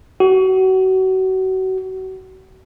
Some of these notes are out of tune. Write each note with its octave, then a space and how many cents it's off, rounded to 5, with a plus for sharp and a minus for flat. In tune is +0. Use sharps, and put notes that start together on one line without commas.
F#4 +30